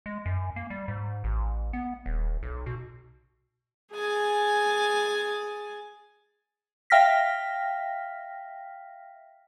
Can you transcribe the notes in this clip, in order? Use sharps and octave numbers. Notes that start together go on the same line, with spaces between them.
G#3
F#2
A#3
G3
G#2
A1
B3
D#1
B1
B2
G#4 G#5 A6
E5 F5 G5 F6 A#6 B6